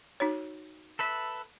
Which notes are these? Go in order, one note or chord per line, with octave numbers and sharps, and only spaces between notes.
D#4 F#4 C#5
A4 B4 E5